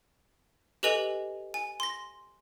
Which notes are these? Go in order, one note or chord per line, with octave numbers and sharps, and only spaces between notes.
G4 A4 B4 D#5 G#5 F7
G#5
C6 A#6